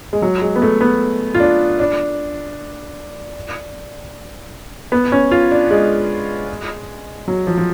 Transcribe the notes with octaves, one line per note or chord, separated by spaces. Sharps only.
G#3
F#3
G#3
B3
A3
B3
F4
D4
D4
B3
C#4
F4
D4
G#3
F#3
F3
F3